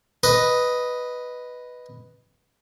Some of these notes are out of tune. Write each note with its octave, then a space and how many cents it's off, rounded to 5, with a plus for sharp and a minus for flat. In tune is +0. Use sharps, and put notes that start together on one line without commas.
B4 +0 D#5 +0